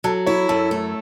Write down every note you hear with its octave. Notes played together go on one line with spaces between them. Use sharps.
F#3 A4
E4 C#5
F#2 A4
A3